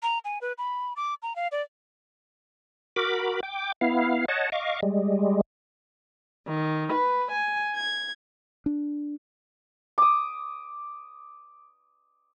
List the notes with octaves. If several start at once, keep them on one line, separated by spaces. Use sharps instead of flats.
A#5
G#5
B4
B5
D6
A#5
F5
D5
F#4 A#4 B5 D6
G5 D6
B3 E4 F5
C#5 D#5 F#5 A5
D#5 F5 C#6 D6
G3 G#3
D#3
B4
G#5
G#6
D4
D6 D#6